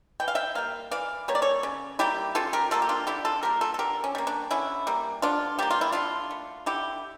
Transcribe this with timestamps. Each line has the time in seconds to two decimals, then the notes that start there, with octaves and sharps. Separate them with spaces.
0.20 E3 G5
0.28 F5
0.35 E5 G5
0.55 G3 A#3 F5
0.91 E3 D5 F5
1.28 G3 A#3 C#5
1.35 D5
1.42 A4 C#5
1.63 C#3
1.99 G3 A#3 E4 G4
2.35 C#3 F4 A4
2.53 G4 A#4
2.71 G3 A#3 F4 A4
2.82 G4
2.89 D4 F4
3.07 D3 E4 G4
3.25 F4 A4
3.43 G3 A#3 G4 A#4
3.61 F4 A4
3.74 A4
3.79 D3 G4 A#4
4.04 C#4
4.15 G3 A#3
4.27 D4
4.51 D3 C#4 E4
4.87 G3 A#3
5.22 D3 D4 F4
5.59 G3 A#3 G4
5.70 F4
5.81 E4
5.92 D3 D4 F4
6.31 A3
6.66 D3 E4 G4